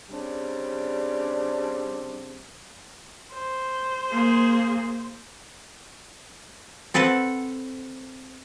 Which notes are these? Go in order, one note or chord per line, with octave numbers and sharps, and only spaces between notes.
C#3 G3 C4 D4
C5
A#3 G#4
C4 A4 B4 C5 F#5